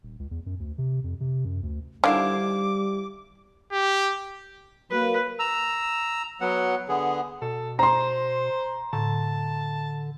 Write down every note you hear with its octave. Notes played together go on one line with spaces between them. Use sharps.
D#1
C#2
E2
F#2
D2
C3
F2
C3
F#2
D2
D3 D#3 G3 E4 C5 F5 D6
G4
F#3 A#3 B4 B5
A#5 E6
F#3 B3 F#5
D3 B3 G#4
B2 A4
C5 A#5 C6
A2 D3 A5